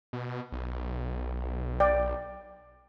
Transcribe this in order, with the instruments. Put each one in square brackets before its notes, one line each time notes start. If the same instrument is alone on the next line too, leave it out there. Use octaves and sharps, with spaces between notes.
[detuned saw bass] B2
B1
[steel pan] D5 G5